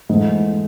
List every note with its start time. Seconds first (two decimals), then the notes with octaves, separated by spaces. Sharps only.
0.09 G#2 E3 A3